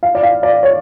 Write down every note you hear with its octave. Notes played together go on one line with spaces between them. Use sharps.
F5
D5
F5
D5
C#5